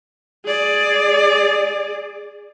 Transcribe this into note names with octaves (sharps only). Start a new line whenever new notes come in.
G#4 D5